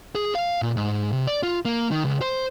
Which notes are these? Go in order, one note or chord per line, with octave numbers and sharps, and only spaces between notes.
G#4
F5
A#2
G#2
C3
D5
F4
A#3
D#3
C#2
C5